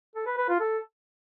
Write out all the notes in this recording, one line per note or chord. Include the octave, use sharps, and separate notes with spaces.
A4
B4
B4
F4
A4